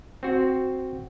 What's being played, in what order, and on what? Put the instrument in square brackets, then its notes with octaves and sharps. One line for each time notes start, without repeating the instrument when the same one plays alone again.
[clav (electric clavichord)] C4 F#4